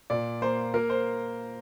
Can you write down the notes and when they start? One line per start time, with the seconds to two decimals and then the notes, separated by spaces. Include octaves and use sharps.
0.10 A#2 D5
0.42 A#3 C5
0.74 A#3 A#4
0.90 C5